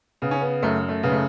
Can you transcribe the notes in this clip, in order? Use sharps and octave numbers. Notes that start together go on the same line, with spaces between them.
C#3 B3
C#4
B3
F#2 A3
A3
C#3 B3
A3